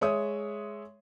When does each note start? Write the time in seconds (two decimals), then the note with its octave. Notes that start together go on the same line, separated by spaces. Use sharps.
0.01 G#3 C#5 E5 D#6